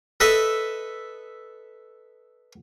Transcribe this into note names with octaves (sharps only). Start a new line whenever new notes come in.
A4 B4 D#5 E5 A5